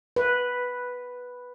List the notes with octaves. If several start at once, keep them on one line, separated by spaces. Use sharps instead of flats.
B4